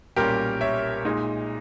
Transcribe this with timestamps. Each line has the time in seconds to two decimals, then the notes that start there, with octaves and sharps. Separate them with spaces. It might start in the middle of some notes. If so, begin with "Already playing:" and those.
0.16 B1 A#2 G3 C#4 G4 A#4
0.61 C#5 E5
1.05 A#2 G#3 D#4